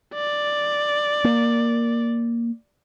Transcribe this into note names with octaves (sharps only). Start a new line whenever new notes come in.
D5
A#3